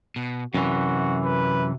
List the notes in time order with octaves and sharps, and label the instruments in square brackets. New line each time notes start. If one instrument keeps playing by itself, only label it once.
[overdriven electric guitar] B2
[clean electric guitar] F#2 E3 [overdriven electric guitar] C3 [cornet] F#4
[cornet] B4